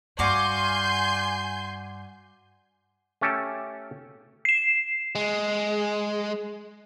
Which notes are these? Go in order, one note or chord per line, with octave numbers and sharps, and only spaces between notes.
G2 F#4 D5 F5 G#5 C6 G6
A3 C#4 G4 A4
C7 E7
G#3